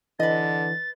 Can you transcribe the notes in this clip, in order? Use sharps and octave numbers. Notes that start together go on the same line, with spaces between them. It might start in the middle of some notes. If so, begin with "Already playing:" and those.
D3 E3 B4 D#5 A6